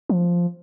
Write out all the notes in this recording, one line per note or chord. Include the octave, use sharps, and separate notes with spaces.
F3